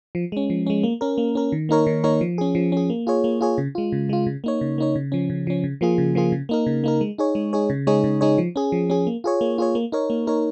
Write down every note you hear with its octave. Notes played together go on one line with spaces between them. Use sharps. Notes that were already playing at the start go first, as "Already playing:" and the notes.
F3
G#3 C#4
F3
G#3 C#4
A#3
C#4 A#4
A#3
C#4 A#4
D#3
A#3 D#4 A#4 C#5
D#3
A#3 D#4 A#4 C#5
F3
C#4 G#4
F3
C#4 G#4
A#3
F4 G#4 C#5
A#3
F4 G#4 C#5
C#3
G#3 F4
C#3
G#3 F4
C#3
A#3 D#4 C#5
C#3
A#3 D#4 C#5
C#3
F3 C#4
C#3
F3 C#4
C#3
F3 A#3 F4 G#4
C#3
F3 A#3 F4 G#4
C#3
A#3 D#4 A#4
C#3
A#3 D#4 A#4
G#3
D#4 G#4 C#5
G#3
D#4 G#4 C#5
C#3
G#3 D#4 G#4 C#5
C#3
G#3 D#4 G#4 C#5
F3
C#4 G#4
F3
C#4 G#4
A#3
F4 G#4 C#5
A#3
F4 G#4 C#5
A#3
D#4 A#4 C#5
A#3
D#4 A#4 C#5